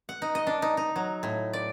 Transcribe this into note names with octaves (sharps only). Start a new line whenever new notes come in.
F#5
D#4
D#5
D4
D#4
D#4
F#3
A2
D5